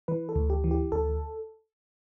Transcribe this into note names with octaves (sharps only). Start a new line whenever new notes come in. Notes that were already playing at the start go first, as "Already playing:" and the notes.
E3 B4
A4
D2
G4
E3
G4
D2 A4